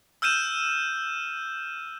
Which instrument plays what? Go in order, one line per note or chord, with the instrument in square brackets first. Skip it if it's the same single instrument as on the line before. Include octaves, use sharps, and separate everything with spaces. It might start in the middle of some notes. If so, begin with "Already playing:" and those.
[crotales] E6 F6 G6 D#7 E7